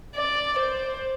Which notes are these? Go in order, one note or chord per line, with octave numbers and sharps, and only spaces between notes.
D5
C5